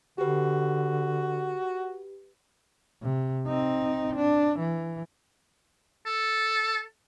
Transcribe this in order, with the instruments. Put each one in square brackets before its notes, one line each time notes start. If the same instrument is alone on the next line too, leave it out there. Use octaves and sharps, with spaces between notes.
[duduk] D3 [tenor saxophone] F#4 [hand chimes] G4 B4
[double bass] C3
C4 D#4
D4
E3
[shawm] A4